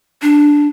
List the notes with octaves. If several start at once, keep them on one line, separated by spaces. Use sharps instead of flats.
D4